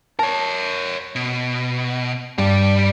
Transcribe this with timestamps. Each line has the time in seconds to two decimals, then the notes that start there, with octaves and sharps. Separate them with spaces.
0.19 A#4 C#5 A5
1.16 B2
2.38 G2 G3 D5